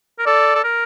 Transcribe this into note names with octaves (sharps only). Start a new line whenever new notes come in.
A#4
A4 D5
A4
A#4